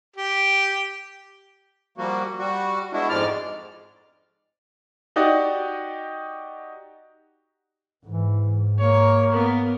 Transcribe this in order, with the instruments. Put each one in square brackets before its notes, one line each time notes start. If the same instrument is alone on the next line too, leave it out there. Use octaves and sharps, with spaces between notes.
[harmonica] G4
[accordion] F3 G3 A#3 F#4
G3 F#4
G#3 B3 D4 E4 F#4
F2 G#2 F3 G#3 D5 F6
[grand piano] D#4 F#4 G4 D5 D#5
[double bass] G#2 [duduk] E3
[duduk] A#3 [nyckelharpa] A#4 C#5
[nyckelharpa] B3 A#4